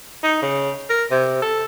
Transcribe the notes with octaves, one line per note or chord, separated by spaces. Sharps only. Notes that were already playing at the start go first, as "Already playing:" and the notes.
D#4
C#3
A#4
C3
A4